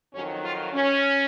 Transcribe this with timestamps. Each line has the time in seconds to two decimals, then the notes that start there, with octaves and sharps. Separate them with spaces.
0.14 F2 D#3 F#3 C#4
0.44 F4
0.74 C#4